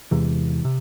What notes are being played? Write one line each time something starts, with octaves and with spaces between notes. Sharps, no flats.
E2 C3 E3 G#3
C3